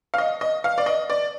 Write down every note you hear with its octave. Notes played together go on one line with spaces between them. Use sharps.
F5
D#5
D#5
F5
D5
D#5
D5